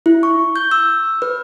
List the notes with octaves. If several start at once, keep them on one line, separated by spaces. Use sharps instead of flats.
E4
C#6
G6
E6
B4